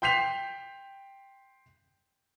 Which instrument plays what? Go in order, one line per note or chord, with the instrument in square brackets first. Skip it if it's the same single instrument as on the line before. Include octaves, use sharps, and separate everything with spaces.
[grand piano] G5 C6 G6 B6 C7 F7